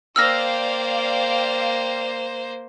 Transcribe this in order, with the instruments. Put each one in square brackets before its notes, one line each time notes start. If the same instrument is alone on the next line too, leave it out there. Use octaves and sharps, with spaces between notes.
[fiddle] A#3 C5 [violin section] D5 F5 G5 [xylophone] E6 F6 A#6